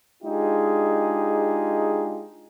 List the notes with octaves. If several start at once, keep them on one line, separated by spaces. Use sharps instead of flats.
G#3 D4 D#4 F4 G4 G#4